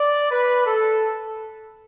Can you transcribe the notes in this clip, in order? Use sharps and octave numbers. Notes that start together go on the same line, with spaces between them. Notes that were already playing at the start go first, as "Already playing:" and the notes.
Already playing: D5
B4
A4